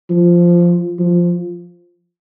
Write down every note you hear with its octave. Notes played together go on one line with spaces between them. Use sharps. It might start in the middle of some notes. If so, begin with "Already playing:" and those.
F3
F3